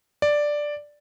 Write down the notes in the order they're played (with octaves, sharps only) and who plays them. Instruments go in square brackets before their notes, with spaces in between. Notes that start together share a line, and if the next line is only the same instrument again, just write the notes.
[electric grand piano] D5